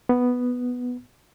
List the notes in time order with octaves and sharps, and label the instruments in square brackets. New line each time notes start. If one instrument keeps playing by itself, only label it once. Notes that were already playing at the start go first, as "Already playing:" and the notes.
[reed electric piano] B3